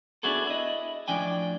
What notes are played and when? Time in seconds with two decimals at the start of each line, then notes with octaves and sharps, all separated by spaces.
0.23 B3 D4 E4 F#4 G#4 A4
0.47 E4 D#5
1.08 A2 F3 D4 G5 G#5